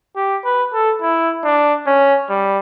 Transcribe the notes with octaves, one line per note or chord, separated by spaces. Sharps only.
G4
B4
A4
E4
D4
C#4
G3